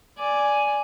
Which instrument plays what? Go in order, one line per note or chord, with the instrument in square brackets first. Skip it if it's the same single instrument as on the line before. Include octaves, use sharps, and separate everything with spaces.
[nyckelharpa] D5 G#5